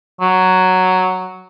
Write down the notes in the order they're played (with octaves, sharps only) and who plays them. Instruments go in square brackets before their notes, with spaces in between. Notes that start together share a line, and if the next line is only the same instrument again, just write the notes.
[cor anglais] F#3